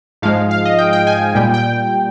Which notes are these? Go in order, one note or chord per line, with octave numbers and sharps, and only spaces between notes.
G#2 F3 G#3 F5
F5
D#5
G5
G5
G#5
A#2 G3 G5
G5